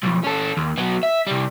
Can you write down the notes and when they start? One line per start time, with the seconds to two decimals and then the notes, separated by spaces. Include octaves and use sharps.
0.03 B1 F2
0.24 C#4 A4
0.57 D#2
0.78 F#3 B3
1.03 E5
1.27 C3 G3